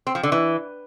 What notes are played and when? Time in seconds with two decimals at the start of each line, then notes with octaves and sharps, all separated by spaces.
0.07 C4
0.15 F3
0.23 D3
0.32 E3